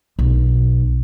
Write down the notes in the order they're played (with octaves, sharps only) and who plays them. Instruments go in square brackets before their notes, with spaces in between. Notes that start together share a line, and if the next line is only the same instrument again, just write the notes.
[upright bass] B1